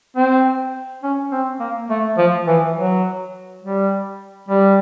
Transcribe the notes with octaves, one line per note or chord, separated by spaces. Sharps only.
C4
C#4
C4
A#3
A3
F3
E3
F#3
G3
G3